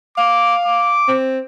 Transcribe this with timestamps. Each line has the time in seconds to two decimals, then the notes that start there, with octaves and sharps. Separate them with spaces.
0.18 F5 D6
0.66 D6
1.08 C4